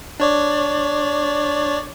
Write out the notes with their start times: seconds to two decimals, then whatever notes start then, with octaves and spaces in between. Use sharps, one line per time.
0.20 D4 C#5 D5